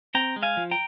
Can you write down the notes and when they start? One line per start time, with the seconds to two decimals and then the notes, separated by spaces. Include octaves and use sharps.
0.15 C4 G5 A#5
0.36 G#3
0.43 F5 G#5
0.57 F3
0.71 G5 A#5